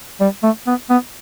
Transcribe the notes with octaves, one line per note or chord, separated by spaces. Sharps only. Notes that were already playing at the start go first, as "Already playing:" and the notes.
G3
A3
B3
B3